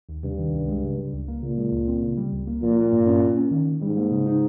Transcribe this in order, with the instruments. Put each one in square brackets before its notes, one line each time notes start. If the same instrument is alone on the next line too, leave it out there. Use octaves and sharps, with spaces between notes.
[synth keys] D#2
[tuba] G2 [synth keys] C3
[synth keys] D#3
C#2
G#3
C#3
G3
C#2
A#3
[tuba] A#2 [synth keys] C#3
[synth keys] G#3
C#2
C4
C#3
G3
C#2
A#3
[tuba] A#2 [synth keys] F3
[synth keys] A#3
G2
C#4
A#3
C#4
D#3
D#3
[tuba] G#2 [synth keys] G3
[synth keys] A#3
C#3
D#4